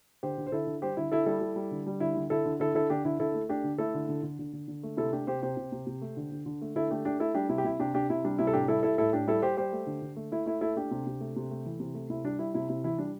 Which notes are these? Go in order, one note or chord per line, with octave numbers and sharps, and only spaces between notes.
D3 G4 C5
D3
C5
D3 E4 A4
D3
G3 G4 C5
D3 E4
D3 E4 A4
G3 E4 A4
G3
G3
D3
G3
D3 E4
D3
D3 E4 A4
D3
D3 E4 A4
D3 E4 A4
D3 D4 G4
D3 E4
D3 E4 A4
A3
A3 D4 G4
D3
A3 E4 A4
D3
D3
D3
D3
D3
D3
A3
C3 E4 A4
A3 D4 G4
C3 G4 C5
C3 G4 C5
C3
C3
C3
A3
D3
D3
D3
A3
D3 E4 A4
A3 D4 G4
A3 D4 G4
A3 E4 A4
G3 D4 G4
C3 E4
G4
C3 E4
C3 D4 G4
C3 D4 G4
C3 E4
G3 D4
C3 E4
A4
A2 D4 G4
G3 E4 A4
G3 E4 A4
A2 E4 A4
A2 D4 G4
G3 E4 A4
G3 G4 C5
G3 G4 C5
A3
D3
D3
A3
A3 E4
A3 E4
A3 E4 A4
A3 D4 G4
C3
C3
A3
C3
A3
E3
C3
A3
C3 E4
G3 D4
G3 E4
C3 E4
C3 E4
E3 E4
G3 D4